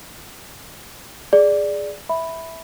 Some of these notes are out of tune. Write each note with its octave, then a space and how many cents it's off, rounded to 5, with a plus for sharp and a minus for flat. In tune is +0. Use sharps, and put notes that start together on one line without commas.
G#4 +0 D5 +0
E5 -10 B5 +0